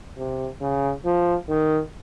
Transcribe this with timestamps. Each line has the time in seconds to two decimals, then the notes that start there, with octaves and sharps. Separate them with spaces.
0.18 C3
0.61 C#3
1.05 F3
1.49 D#3